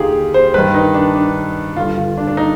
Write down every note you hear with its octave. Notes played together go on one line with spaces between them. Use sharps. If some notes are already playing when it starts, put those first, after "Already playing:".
Already playing: D#2 D3 D#4 F4 G4 G#4
C5
G2 D#3 B4
D#4
D4
D4
G2 D3 F4
F4
D4
D4
D#4